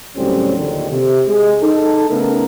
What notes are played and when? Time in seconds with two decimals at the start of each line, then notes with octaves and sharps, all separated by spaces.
0.17 C#2 A2 F#3 G3 C4 C#4
0.57 A#1 D#2 D3 D#3
0.90 C3
1.27 G#3
1.62 D#4 A4
2.09 C#3 A3 B3 A4 A#4